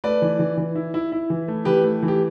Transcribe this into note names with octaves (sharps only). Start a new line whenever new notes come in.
A3 B4 D5
E3
E3
E3
E4
E4
E4
E3
A3
E3 G4 B4
A3
E3
G4